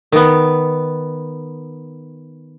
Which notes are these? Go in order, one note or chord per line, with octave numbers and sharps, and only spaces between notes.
D#3 B3